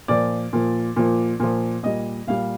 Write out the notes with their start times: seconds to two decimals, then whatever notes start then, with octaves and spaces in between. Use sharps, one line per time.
0.08 A#2 F3 D5
0.53 A#2 F3
0.96 A#2 F3
1.40 A#2 F3
1.83 A#2 G3 D#5
2.27 A#2 G3 F5